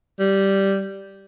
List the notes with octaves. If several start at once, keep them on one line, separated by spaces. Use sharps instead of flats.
G3